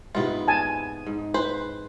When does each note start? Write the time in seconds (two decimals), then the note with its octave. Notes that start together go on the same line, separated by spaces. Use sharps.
0.15 G#2 C3 B3 E4 F4
0.48 G#5 A5
1.06 G#2
1.34 B4 C5